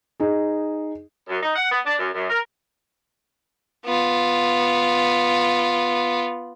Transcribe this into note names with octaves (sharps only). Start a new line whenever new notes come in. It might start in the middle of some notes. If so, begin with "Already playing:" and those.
D#4 G#4
F#2
D#4
F#5
B3
D4
F#2
F#2
A#4
B3 F4